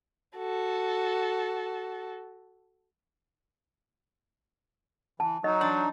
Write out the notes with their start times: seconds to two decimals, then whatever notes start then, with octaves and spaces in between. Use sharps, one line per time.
0.37 F#4 A4
5.20 E3 A5
5.44 F#3 D#4 D#5
5.61 D4 C6